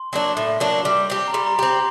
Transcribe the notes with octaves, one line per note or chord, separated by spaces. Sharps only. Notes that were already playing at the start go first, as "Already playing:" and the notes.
Already playing: C6
F#3 A#3 D4
A2
F#3 A#3 D4
G3 D6
C4 G4
A#5
G3 C6
A#5
C4 G4 A#5
C6